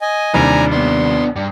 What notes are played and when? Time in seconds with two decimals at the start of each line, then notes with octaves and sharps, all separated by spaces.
0.01 D#5 G#5
0.34 D#2 C3 E3 G3 D4 G#5 A#5
0.72 B3 D4 C6
1.36 G2